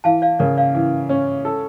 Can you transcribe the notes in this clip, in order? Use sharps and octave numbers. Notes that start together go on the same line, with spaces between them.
E3 F5 A5
D5 F5
C#3 A#4 D5
D5 F5
E3
C#4
A4